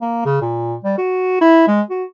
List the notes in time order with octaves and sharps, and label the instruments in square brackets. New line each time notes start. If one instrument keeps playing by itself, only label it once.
[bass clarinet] A#3
C#3
A#2
G3
F#4
E4
G#3
F#4